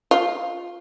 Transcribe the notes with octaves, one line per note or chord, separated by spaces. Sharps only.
F4